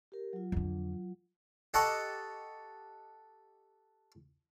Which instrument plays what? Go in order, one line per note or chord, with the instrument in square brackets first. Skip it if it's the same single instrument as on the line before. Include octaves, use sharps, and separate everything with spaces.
[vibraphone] G4 A#4
F#3 F4
[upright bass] F2 D3
[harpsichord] G4 A4 D#5 F#5 A5 C#6